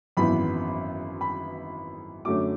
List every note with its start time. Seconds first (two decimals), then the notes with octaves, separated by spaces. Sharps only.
0.17 G#1 F#2 E3 B3 B5
1.21 B5
2.25 F#2 D3 F#3 A3 C#4 D6